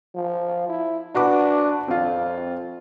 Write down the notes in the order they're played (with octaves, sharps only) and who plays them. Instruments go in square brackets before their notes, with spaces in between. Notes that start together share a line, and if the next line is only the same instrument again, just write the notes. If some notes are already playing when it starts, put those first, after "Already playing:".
[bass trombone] F3
E4
[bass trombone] D4 [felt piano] F#4 B4 D6
[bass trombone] F2 [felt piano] C4 F4